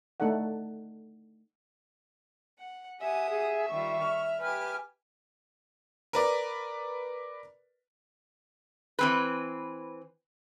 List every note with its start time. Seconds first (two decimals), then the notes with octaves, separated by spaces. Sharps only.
0.20 A3 D#4 A4 D5 F#5
2.60 F#5
3.01 G4 E5 F#5 G#5 D#6
3.30 G#4
3.69 D#3 G3 F4 C#6
4.03 F6
4.42 G4 B4 G#5 F6
6.13 A#4 B4 D5
8.99 E3 C4 B4